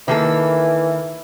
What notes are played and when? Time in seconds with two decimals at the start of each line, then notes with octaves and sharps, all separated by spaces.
0.08 D#3 E3 A#3 A4